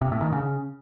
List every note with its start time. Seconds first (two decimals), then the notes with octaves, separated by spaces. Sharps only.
0.02 C3
0.12 A2
0.22 D#3
0.33 C#3